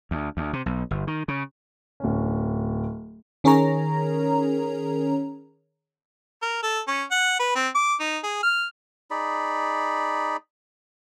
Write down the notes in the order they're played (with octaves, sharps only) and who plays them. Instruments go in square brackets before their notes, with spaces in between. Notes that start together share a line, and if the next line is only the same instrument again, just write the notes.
[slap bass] D2
D2
C3
B1
G1
D#3
C#3
[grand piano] D1 C#4
[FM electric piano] D#3 C#4 G#4 A#4 C#5 A#5
[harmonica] A#4
A4
C#4
F#5
B4
C4
D6
D#4
G#4
F6
[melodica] D#4 G#4 D5 B5